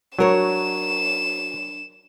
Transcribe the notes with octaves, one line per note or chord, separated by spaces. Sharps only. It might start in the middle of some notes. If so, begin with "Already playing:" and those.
F#3 D4 A#4 C#5 E7